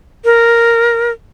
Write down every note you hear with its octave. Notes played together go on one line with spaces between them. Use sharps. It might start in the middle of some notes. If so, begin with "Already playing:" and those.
A#4